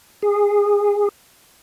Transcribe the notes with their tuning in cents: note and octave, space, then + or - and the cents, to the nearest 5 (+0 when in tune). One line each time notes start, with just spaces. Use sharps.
G#4 -20